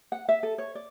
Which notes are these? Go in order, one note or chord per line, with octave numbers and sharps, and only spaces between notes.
F#5
E5
A4
C#5
D5